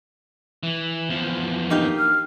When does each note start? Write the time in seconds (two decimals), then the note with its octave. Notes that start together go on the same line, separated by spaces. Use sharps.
0.63 E3
1.09 E2 F3
1.70 A#3 D#4 G4
1.99 F6